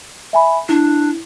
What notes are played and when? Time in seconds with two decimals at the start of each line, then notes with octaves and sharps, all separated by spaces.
0.33 E5 G#5 B5
0.69 D4 E4